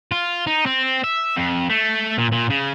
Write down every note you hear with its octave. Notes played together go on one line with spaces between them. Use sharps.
F4
D#4
C4
E5
F2
A3
A#2
A#2
C#3